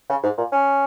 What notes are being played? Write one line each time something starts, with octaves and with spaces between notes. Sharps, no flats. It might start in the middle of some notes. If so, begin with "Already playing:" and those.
C#3
G#2
A#2
C#4